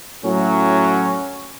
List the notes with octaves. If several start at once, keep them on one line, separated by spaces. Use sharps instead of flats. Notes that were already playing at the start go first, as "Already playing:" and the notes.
A2 F#3 C#4